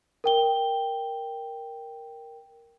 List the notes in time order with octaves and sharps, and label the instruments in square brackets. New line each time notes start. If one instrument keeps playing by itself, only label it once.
[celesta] A#4 G5 G7